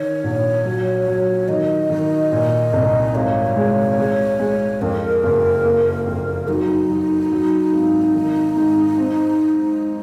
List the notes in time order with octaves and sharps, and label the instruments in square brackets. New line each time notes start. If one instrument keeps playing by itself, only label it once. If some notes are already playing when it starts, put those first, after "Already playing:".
Already playing: [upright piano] D#3 [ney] C#5
[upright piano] A#1
F#3
F#3
[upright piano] D#3 [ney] D#5
[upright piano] D#3
A#2
C2
[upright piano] G#1 [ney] C#5
[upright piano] G#3
G#3
G#3
[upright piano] F2 [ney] A#4
[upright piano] F#1
A#3
F2
[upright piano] F#3 [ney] D#4
[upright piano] F#3
F#3
G#1
D#3
G#2
C4